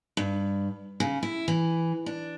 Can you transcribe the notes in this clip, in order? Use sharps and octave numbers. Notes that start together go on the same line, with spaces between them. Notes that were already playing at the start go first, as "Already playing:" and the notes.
G2
C#3
E4
E3
D4